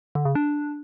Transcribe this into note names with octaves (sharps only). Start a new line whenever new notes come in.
D3
C#3
D4